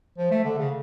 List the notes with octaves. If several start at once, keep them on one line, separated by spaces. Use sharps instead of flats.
F3
A3
D3
C#3